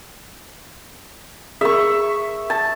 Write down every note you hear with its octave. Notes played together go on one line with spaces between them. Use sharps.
G#4 A#4 E5 C#6
A5